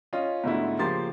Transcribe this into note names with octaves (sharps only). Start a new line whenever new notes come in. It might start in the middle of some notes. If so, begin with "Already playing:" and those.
C#4 F4 D#5
G#2 B2 D3 A3 E4
C#3 F3 A#3 G4 C6 A6